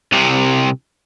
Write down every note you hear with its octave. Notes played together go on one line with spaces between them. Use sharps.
C2 C3